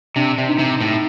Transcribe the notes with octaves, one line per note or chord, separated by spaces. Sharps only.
C3 D4
C3
D#4
C3
A2